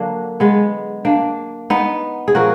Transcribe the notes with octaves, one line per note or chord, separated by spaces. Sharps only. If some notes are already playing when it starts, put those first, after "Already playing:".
Already playing: D3 F#3 A#3 D4
G#3 B3
A#3 D4
B3 D#4
G#4
A#2 F3 F#4 A#4